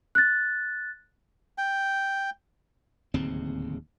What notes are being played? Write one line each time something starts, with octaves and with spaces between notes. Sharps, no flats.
F#6 A6
G5
D1 D#2 C#3 C4